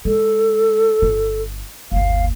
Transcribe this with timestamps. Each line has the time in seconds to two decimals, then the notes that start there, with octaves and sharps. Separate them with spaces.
0.05 G#3 A4
1.02 G1 F4
1.92 G1 D#2 F5